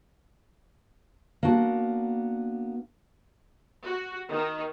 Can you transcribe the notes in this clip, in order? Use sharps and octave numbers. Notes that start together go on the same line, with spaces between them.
A#3 B3 D4 F#4
F#4
D#3